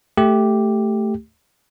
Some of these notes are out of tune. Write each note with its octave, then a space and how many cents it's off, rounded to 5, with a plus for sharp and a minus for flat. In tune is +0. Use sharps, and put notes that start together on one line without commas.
A3 +0 G4 +0